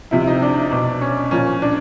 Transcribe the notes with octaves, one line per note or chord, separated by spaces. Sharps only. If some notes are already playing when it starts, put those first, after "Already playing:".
C3 F3 E4
E4
D#4
D4
B2
C#4
A#2 F3 C#4
D4